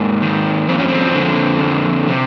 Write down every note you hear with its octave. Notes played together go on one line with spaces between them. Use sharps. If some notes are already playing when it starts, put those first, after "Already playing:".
Already playing: G#2 A#3
D#3
F2 C4
C#4
C4
D3
F2
C3